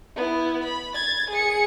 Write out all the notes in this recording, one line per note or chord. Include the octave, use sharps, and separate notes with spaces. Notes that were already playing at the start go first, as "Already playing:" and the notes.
B3 E4
B5
G#6 A6
G#4 C#7